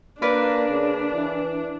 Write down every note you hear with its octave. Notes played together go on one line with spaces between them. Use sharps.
A#3 D4 A#4 B4 D5
C#3
E3